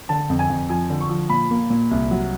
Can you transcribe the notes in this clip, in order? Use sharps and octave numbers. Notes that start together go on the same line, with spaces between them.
D3 A5
F2
G#5
F2
F3 G#5
D3
C#6
F3
A#2 B5
A#3
A#2
C2
F#3